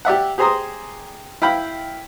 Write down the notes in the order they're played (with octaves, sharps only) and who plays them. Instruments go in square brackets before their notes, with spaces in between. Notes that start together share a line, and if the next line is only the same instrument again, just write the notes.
[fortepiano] G4 D5 E5 F#5
G4 G#4 C5 A#5 C6 D#6
E4 F5 G5 B5